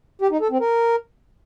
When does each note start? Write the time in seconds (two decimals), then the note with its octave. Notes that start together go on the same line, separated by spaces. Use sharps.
0.22 G4
0.31 D#4
0.41 A4
0.51 C4
0.60 A#4